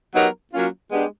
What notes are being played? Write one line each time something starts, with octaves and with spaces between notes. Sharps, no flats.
F#3 B3 D#4 G4 A#4
F#3 A#3 C#4 F4
G#3 B3 D4 G4